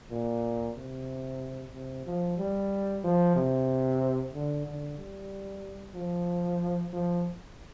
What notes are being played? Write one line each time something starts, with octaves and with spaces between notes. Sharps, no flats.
A#2
C3
C3
F3
G3
F3
C3
D3
D3
G3
F3
F3